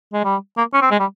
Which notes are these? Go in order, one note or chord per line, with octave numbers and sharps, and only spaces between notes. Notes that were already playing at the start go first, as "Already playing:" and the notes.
G#3
G3
A#3
C#4
C4
G#3
G3